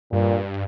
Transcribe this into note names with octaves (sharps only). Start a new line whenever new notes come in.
G2 A#2